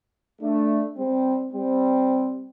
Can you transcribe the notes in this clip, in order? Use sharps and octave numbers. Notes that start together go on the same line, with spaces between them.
A3 D4
G3 C4
G3 C4